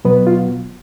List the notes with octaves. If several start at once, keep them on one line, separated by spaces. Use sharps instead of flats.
B2 F#3 B3 B4
F4